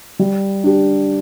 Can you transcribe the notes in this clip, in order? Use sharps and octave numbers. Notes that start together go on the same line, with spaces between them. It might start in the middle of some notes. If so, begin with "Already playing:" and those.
G3
D4 G4